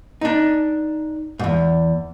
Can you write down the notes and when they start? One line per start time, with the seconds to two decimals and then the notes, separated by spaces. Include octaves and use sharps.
0.21 D4 D#4
1.39 E2 G#2